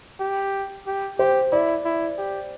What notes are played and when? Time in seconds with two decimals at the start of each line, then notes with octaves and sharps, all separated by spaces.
0.20 G4
0.87 G4
1.19 G4 C5
1.52 E4 D5
1.85 E4
2.18 G4